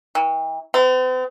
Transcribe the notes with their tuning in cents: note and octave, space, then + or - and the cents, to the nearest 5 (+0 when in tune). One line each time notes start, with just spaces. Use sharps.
E3 -45
C4 -45